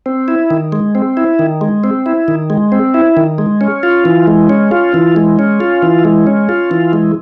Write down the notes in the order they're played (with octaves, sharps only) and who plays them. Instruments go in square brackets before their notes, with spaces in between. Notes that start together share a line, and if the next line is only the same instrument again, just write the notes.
[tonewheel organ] C4
E4
D#3
G#3
C4
E4
D#3
G#3
C4
E4
D#3
G#3
C4
E4
D#3
G#3
C#4
F4
E3
G#3
C#4
F4
E3
G#3
C#4
F4
E3
G#3
C#4
F4
E3
G#3